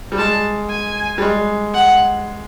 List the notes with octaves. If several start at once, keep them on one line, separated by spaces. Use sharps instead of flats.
G3
G#3 A5
G#5
G3
G#3
F#5